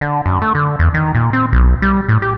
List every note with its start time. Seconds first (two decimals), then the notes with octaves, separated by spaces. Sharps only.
0.01 D3
0.26 F#2
0.42 A3
0.55 D3
0.79 E2
0.94 D#3
1.15 A#2
1.33 C4
1.53 B1
1.82 G3
2.09 A2
2.22 G4